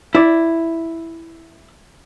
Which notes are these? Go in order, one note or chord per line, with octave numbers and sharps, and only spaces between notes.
E4 D5